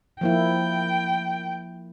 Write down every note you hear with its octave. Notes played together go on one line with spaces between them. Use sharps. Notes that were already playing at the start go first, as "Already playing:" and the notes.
F3 A#3 E4 G5